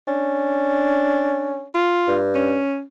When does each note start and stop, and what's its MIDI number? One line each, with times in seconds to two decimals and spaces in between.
0.08 1.66 61
0.08 1.62 62
1.74 2.17 65
2.08 2.58 43
2.35 2.82 61